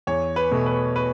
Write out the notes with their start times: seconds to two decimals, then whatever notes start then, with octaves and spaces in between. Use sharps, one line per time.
0.07 E2 C#5
0.36 B4
0.51 B2 A3
0.66 B4
0.96 B4